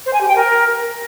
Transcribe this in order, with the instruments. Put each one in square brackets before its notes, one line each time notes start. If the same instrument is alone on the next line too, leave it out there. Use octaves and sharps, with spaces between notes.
[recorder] C5
G#5
G4
G5
A#4